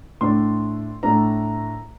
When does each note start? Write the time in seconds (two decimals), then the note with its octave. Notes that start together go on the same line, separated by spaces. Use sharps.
0.21 A2 A3 D4 C6
1.03 A2 A3 D4 A#5